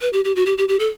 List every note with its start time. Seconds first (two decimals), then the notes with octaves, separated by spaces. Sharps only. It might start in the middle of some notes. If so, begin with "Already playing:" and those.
0.01 B4
0.13 G4
0.24 G4
0.36 F#4
0.46 G4
0.58 G4
0.68 G4
0.79 A4